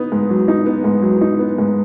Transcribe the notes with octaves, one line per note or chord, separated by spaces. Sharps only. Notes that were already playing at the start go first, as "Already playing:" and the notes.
Already playing: B3 D#4
G#2
F#3
D#4
B3
G#2
F#3
D#4
B3
G#2